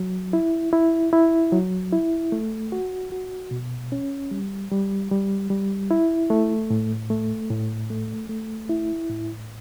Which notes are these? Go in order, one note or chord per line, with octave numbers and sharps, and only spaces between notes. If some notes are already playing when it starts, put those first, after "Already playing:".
Already playing: F#3
E4
E4
E4
F#3
E4
A3
F#4
F#4
B2
C#4
G3
G3
G3
G3
E4
A3
A2
A3
A2
A3
A3
E4
A2